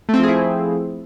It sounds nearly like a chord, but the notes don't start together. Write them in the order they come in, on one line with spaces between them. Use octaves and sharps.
A3 C4 F3 G#4 E4